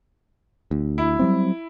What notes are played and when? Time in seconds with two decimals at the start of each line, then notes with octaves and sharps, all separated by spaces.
0.71 D2
0.98 E4
1.19 F#3 G3 C4